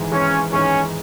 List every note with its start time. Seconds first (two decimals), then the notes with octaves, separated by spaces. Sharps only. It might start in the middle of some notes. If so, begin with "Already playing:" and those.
Already playing: G#1 G#2 E3 G#3
0.11 G#1 G#2 E3 G#3 C#4
0.53 G#1 G#2 E3 G#3 C#4